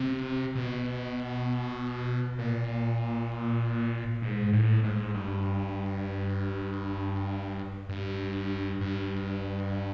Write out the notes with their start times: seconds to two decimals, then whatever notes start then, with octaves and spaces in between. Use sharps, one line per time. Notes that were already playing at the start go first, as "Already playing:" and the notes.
Already playing: C3
0.55 B2
2.39 A#2
4.22 G#2
4.53 A2
4.84 G#2
5.14 G2
7.89 G2
8.81 G2